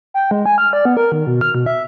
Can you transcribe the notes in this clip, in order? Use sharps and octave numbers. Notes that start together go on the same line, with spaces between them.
G5
G#3
G#5
F6
D5
B3
A#4
D#3
B2
F6
B2
E5